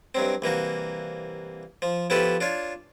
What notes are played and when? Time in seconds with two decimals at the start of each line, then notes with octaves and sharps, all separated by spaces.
0.15 G2 F#3 C4
0.42 C2 E3 A#3 F#4
1.82 F3
2.10 F3 B3 E4 G4 A4 B4
2.41 D4 F4 C#5